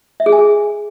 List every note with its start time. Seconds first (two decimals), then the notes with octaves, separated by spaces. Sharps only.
0.20 E5
0.26 G#4
0.32 G#5
0.39 G#4